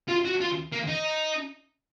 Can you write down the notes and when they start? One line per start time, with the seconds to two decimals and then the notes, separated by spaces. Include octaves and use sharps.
0.08 F4
0.25 F#4
0.41 F4
0.73 A#3
0.89 D#4